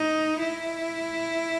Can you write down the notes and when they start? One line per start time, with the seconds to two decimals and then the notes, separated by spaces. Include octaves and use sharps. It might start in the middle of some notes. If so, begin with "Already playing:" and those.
Already playing: D#4
0.39 E4